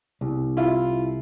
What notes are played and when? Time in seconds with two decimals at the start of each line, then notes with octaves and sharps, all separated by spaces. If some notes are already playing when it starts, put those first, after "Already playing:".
0.21 C2
0.57 E4 F4